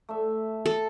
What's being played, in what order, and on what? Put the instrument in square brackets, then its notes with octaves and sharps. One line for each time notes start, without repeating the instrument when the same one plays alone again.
[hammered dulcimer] A3 E5
[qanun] A4